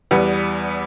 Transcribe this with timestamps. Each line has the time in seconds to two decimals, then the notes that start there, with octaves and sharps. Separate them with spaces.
0.11 E2 G3 B3